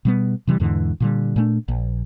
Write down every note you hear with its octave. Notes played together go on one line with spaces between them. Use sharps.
B2 G3 B3
C3 E3 F#3 G3
E2 G#2 D3 E3
A#2 D3 G3
A#2 A3 D4
A#1